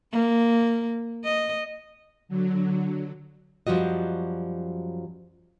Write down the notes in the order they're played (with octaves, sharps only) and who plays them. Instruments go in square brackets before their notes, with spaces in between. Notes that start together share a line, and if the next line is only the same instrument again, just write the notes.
[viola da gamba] A#3
D#5
[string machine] D3 F#3
[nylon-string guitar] F#2 F3 G3 F#4 D#5